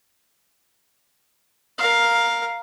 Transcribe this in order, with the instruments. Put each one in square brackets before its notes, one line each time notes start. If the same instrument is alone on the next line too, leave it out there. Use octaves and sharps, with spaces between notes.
[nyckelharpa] A#4 F5